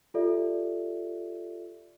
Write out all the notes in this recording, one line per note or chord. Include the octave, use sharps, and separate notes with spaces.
F4 G4 A4 D5 E5